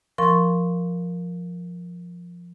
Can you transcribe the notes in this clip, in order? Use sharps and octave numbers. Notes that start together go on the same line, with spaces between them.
F3 A#4 C6 C#6